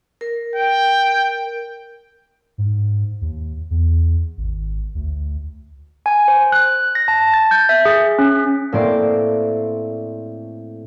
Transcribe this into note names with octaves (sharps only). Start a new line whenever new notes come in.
A#4
G5
G#2
D#2
E2
G#1
D2
G#5
C5
F#6
A#6
A5
A6
G6
E5
G#4
C#4
A2 A#3 C4 C5 D5